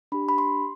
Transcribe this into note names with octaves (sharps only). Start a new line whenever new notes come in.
D4 G4 B5
B5
C6